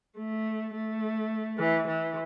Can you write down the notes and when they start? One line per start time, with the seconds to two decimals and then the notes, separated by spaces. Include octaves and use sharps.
0.18 A3
0.75 A3
1.58 E3
1.87 E3